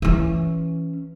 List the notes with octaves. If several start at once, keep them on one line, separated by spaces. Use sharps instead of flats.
E3 C#4